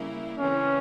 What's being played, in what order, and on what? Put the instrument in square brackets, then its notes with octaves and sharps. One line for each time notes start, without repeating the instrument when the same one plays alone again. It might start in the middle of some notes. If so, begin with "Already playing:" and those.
Already playing: [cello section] C#3 G3 A#3 E4 A#4
[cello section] C#3 E3 G#3 C4 [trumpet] C#4